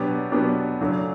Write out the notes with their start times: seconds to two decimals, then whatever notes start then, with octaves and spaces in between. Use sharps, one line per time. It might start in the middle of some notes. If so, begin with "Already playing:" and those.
Already playing: B2 F#3 B3 D4 G4
0.32 B2 F#3 B3 D4 G4
0.81 F#2 C#3 F#3 A3 D4